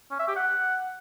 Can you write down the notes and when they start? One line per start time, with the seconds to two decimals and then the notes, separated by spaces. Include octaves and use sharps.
0.11 C#4
0.19 E5
0.28 G4
0.37 F#5